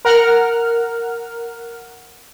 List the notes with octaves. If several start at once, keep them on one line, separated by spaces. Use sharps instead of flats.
A#4 F#5 F6